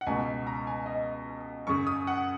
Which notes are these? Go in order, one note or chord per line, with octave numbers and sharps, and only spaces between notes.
F#5
C#2 B2 G#5
A#5
G#5
D#5
F#2 C#3 C#6
D#6
F#5